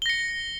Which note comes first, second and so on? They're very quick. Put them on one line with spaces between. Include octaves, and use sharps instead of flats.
G7 A#6 C#7